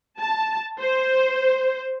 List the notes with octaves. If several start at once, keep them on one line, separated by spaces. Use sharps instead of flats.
A5
C5